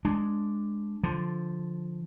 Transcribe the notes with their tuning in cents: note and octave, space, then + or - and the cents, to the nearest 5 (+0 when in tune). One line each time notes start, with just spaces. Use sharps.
G#3 +0 D4 +0
D3 +0 F3 +0